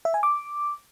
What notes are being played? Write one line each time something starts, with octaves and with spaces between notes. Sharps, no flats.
E5
G#5
D6